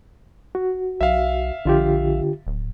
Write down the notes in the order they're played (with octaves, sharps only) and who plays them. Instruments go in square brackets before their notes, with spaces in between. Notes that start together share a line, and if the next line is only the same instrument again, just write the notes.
[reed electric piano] F#4
[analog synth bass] B1 [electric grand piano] E5 F5
[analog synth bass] A#1 [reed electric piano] D3 F4 G4
[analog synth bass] D1